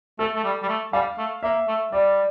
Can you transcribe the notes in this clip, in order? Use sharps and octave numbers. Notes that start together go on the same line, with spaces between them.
A3 A4
A3
G3
G3
A3
G3 F5
A3
A#3 E5
A3
G3 D5